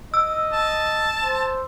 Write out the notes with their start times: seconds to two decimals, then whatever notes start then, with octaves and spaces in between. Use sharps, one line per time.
0.14 D#5 E6
0.53 A5
1.22 C5